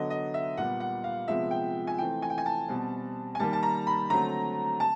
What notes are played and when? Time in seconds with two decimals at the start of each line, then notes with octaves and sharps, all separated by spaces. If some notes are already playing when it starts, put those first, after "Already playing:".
Already playing: D3 F#3 B3 D#5
0.10 D#5
0.34 E5
0.57 A#2 G3 B3 F#5
0.80 F#5
1.04 F5
1.28 C3 F3 G#3 B3 E5
1.51 G5
1.87 G#5
1.98 E3 A3 C4 G5
2.22 G#5
2.30 G5
2.38 G#5
2.46 A5
2.68 B2 G3 C4
3.35 G#5
3.40 D#3 G3 A#3 A5
3.53 A5
3.63 A#5
3.87 B5
4.10 D3 F#3 A3 C4 A#5
4.80 A5